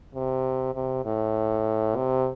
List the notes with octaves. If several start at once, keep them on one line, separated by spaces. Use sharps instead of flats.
C3
C3
A2
C3